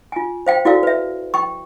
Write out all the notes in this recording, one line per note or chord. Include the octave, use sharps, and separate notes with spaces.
F4 G#5
C5 F5 G5
E4 F#4 A4 A#4 D5 F5
B4 E5
G5 C#6